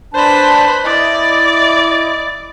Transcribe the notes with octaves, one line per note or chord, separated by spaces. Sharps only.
D4 B4 C5 A5 B5
E4 D5 D#5